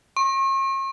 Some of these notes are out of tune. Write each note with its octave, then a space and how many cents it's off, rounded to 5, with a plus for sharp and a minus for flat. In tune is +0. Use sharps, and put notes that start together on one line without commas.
C#6 -40